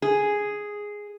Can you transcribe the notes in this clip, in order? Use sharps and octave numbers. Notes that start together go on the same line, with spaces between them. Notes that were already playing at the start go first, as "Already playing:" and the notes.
G#4